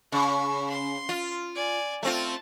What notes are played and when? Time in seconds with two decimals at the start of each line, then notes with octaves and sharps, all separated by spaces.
0.12 C#3 C#6
0.70 C6
1.09 F4
1.55 D5 G#5
2.03 A3 C4 F4 A5